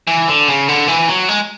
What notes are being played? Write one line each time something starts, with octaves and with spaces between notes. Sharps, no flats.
E3
D3
C#3
D3
E3
F#3
G#3